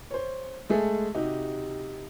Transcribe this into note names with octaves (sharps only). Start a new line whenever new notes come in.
C5 C#5
G#3 A3 G#4 A4
C3 D#4 F#4 G4